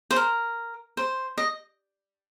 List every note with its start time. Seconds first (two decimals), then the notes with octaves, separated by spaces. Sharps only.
0.11 C5
0.16 A#4
0.97 C5
1.38 D#5